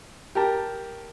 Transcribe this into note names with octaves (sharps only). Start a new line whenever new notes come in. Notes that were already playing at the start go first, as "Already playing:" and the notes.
G4 A#4 A5